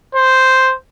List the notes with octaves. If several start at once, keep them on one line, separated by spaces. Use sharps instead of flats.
C5